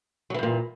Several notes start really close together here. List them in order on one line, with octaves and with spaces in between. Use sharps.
F#3 E3 G2 A#2